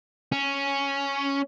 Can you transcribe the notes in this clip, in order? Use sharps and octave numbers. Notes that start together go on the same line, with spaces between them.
C#4